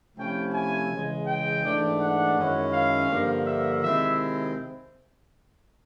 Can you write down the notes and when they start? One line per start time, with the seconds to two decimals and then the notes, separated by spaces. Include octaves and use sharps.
0.17 C3 F3 A3 C#4 E4 G5
0.54 G#5
0.91 C#3 E3 G#3
1.26 G5
1.63 G#2 E3 A3 D4
1.99 F#5
2.36 F#2 D#3 G#3 C#4 E4
2.73 F5
3.09 G2 D3 F3 A#3
3.45 E5
3.82 C3 D#3 G#3 C4 E4 E5